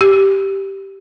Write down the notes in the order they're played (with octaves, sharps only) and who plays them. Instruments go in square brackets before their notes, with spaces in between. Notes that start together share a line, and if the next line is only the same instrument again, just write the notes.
[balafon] G4